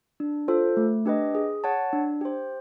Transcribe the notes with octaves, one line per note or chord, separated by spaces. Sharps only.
D4
F4 A4 C5
A3
D4 G4 B4 D#5
G#4
C#5 F#5 A5
D4
G4 C5